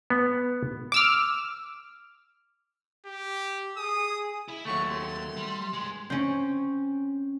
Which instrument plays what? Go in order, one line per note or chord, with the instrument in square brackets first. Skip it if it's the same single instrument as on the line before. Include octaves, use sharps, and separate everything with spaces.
[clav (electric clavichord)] B3
[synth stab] D6 E6 F6
[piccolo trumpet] G4
[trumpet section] G#4 [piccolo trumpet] D#6
[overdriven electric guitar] E4 E5
[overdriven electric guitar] D#2 [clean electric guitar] F#3 A3 [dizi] C#6
[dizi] C6
[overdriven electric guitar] G3
G2 G#3
[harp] C4 C#4